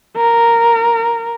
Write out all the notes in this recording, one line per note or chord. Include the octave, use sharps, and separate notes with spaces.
A#4